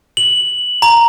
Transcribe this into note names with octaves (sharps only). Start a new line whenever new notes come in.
F#7
A#5